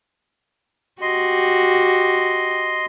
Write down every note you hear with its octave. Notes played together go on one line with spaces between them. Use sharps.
F#4 G4 D#5 C6